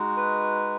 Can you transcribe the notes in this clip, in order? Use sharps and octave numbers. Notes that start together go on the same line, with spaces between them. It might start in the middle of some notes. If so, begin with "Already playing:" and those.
Already playing: G#3 D#4 F#4
B4